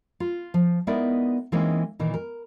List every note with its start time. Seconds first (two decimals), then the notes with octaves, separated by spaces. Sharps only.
0.20 F4
0.54 F3
0.87 G#3 B3 D#4 E4 A#4 D5
1.52 E3 G#3 A#3 C4 C#4 D#4
1.99 A#2 D#3 E3
2.14 A#4